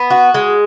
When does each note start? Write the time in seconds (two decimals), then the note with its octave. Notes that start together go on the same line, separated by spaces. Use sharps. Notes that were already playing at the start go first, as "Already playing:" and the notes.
Already playing: B3
0.10 F#4
0.34 G#3